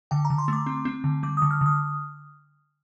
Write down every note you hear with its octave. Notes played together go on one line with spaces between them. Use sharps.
D3 G5
A#5
D3
C6
A3 D6
C4
C4
D3
G3 D6
D#6
D3
F6
D3 D#6